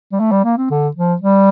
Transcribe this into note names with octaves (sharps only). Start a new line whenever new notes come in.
G3
A3
G3
A#3
C4
D3
F3
G3